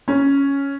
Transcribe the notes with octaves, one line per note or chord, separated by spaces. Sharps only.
C#4